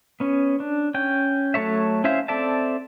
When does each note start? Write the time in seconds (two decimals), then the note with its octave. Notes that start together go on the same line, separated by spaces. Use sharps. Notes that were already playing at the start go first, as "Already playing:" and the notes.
0.20 B3 C#4
0.60 D4
0.94 C#4 G5
1.54 F#3 A3 A4 C#5 E5
2.04 C#4 E4 C5 E5 F5
2.28 C4 A4 D5 E5 A5